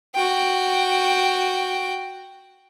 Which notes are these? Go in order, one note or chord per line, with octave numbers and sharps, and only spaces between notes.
F#4 G5